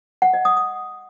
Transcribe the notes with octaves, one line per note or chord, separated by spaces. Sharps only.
F#5
D#5
D#6
D#6